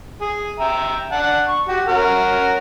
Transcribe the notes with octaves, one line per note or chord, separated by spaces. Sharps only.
G#4
E5 G5 A#5
D4 F#5 A5
C#6
F#4 G4
C#4 F#4 A#4